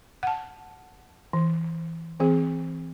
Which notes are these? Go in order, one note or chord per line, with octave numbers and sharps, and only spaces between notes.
F#5 A5
E3
E3 C4 G#4